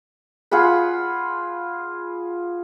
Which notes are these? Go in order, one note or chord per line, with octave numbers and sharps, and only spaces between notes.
F4 G#4 F#5 B5